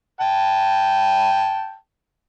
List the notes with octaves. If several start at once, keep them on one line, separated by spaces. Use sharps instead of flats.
G5 A5